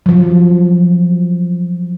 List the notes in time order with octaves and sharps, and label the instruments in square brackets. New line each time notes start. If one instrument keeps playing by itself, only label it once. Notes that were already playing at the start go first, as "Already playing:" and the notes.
[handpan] F3 F#3